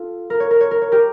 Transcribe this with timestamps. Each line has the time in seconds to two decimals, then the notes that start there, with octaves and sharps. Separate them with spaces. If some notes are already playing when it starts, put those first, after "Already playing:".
Already playing: F4 A4
0.30 A#4
0.40 C#5
0.51 A#4
0.61 C#5
0.71 A#4
0.82 C#5
0.92 G4 A#4